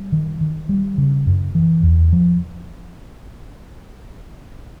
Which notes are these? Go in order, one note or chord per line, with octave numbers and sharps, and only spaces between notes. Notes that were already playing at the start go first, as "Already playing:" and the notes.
Already playing: G3
D#3
D#3
G3
C#3
F#2
E3
E2
F3